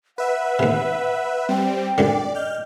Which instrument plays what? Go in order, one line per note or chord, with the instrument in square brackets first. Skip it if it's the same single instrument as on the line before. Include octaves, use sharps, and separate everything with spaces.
[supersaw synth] B4 E5 [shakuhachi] F#5
[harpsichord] D#2 C3
[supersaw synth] G3 C4 [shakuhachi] G5
[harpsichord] C2 F#2 D3 [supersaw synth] D5
[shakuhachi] D#5 [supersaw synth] F6 G6